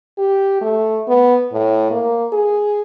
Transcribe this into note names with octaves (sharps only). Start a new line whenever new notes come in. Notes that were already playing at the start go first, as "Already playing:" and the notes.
G4
A3
B3
A2
A#3
G#4